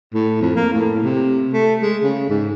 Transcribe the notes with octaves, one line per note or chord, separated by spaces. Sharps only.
A2
F2
A#3
A2
C3
A3
G#3
C#3
G#2